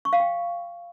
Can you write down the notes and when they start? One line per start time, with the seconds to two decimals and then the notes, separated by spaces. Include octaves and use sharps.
0.05 C#6
0.13 F5
0.20 G5